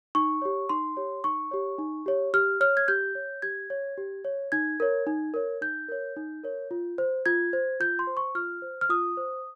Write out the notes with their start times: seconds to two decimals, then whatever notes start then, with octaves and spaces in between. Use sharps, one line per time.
0.15 D#4 C#6
0.42 G4 C#5
0.69 D#4 C6
0.97 G4 C#5
1.24 D#4 C#6
1.51 G4 C#5
1.79 D#4
2.06 G4 C#5
2.34 G4 F6
2.61 C#5 F6
2.77 G#6
2.88 G4 G6
3.15 C#5
3.42 G4 G#6
3.70 C#5
3.98 G4
4.25 C#5
4.52 D#4 G#6
4.80 A#4 C#5
5.07 D#4
5.34 A#4 C#5
5.62 D#4 G6
5.89 A#4 C#5
6.16 D#4
6.44 A#4 C#5
6.71 F4
6.98 C5
7.26 F4 G#6
7.53 C5
7.80 F4 G6
7.99 C6
8.07 C5
8.17 C#6
8.35 F4 F6
8.62 C5
8.81 F6
8.89 F4 D#6
9.17 C5